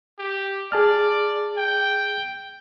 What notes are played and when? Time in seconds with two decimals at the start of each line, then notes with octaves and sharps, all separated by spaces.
0.19 G4
0.72 G#4 D5 A5 F6
1.57 G5